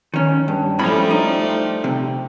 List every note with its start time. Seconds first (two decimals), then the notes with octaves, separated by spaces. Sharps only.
0.14 D#3 C#4
0.48 G2
0.79 A2 F3 G3 A3 C#4 B5
1.11 D#4
1.84 C3